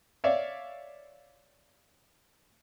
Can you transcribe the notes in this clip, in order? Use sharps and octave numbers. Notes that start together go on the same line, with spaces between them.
C#5 D5 E5 F5